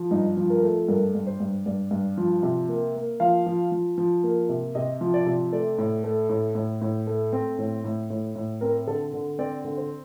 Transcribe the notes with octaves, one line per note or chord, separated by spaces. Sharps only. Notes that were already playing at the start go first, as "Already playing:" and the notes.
Already playing: F3
G2 D#4
F3
A#4
A3
G2 A#4
G2
C5
G2
G2 D5
G2
F3
C3
A#3
A#3
F3 F5
F3
F3
F3
A#3
C3
C3 D#5
F3
D5
C3
A3 D5
A2
A3
A2
A2
A2
A3
C4
A2
A2
A2
A2
C4 A#4
D3 A4
D3
C4 D5
D3
C5